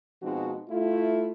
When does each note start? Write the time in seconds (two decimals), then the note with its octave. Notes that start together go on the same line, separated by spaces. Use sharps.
0.22 B2 F3 G#3 C4 D#4 F#4
0.68 A3 E4 F4